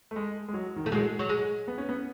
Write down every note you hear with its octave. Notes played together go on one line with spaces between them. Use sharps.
A3
G#3
G#3
F#3
D#3
E3 A3
F#3 G#3
F#3
G#3
B3
C#4
B3